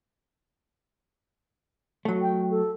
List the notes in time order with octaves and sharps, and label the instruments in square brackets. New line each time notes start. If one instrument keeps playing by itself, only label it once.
[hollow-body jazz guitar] F#3 A3
[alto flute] G5
A4